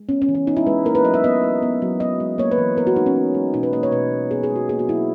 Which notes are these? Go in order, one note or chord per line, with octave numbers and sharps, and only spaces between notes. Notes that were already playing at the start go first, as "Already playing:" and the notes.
Already playing: G#3
B3 C#4
C#4
E3
C#4
B3 D#4
E4
G#3 B4
A#3 A#4
B4
F#3 D#5
E5
B3 D#5
G#3
B3
F#3
B3 D#5
G#3
A#3 C#5
B4
E3
B3 A#4
F#4
G#3 D#4
C#4
B3
G#3
B2 D#4
B4
A#3 D#5
C#5
B2 B4
A#3
B3 G#4
G#4
G#3
F#4
A#3 G#4
F#4
F#3 E4